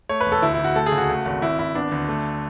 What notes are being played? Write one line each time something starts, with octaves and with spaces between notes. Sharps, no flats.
A3 C#5
B4
E1
A4
D2 E4
E4
D2
F#4
A3 A4
G#4
C#2
F#4
A3
G#1
G#1 E4
G#1 E4
B3 D4
D2
A3